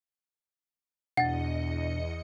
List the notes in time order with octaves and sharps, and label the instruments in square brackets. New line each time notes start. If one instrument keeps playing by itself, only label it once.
[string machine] E2 D#5 C#7 [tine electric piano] B2 D4 [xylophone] F#5 A6